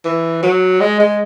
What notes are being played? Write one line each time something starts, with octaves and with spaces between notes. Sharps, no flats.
E3
F#3
G#3
G#3